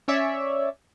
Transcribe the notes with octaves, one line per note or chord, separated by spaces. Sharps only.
C#4 C#5 D5 E5